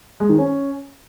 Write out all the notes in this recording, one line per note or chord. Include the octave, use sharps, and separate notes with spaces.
G#3
D#3
C#4